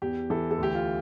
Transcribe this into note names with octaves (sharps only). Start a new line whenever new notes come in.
E2 G4
E3 A4
A4
D2 G4
F4